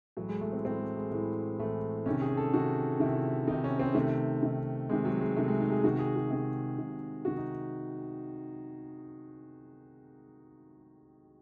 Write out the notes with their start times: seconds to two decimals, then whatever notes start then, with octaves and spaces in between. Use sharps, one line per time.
0.17 A2 E3 F#3
0.29 G#3
0.41 A3
0.53 C4
0.64 A2 E3 C4
0.80 A3
0.96 G#3
1.11 A2 E3 G#3
1.59 A2 E3 A3
2.06 C3 D#3 C#4
2.22 G#4
2.37 A4
2.53 C3 D#3 F#4
3.00 C3 D#3 E4
3.47 C3 D#3 D#4
3.64 C#4
3.79 C4
3.95 C3 D#3 A3
4.43 C3 D#3
4.89 C3 D#3 G#3
5.05 F#3
5.21 G#3
5.36 C3 D#3 A3
5.48 G#3
5.60 D#4
5.71 G#4
5.84 C3 D#3 F#4
5.99 G#4
6.16 F#4
6.30 C3 D#3 G#4
6.78 C3 D#3
7.25 C3 D#3 F#4
7.37 D#4